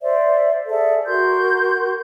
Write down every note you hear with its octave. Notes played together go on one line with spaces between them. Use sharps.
C5 D5 E5
G#4 A4 D5 E5
F#4 A#4 C6 G6